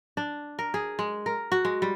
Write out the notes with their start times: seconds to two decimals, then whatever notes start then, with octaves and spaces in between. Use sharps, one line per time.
0.17 D4
0.59 A#4
0.74 G#4
0.99 G#3
1.26 A#4
1.52 F#4
1.65 G#3
1.82 G3